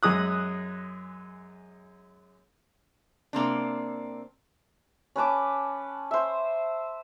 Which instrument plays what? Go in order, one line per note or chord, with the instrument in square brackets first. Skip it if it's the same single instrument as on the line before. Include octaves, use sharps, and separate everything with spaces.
[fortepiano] F#2 G#3 D#6 F#6
[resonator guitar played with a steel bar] C3 A#3 C4 D4
[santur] C#4 B4 A5 D6
C5 E5